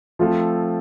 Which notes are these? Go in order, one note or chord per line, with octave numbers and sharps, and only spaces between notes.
F3 A3 C4 F4 A4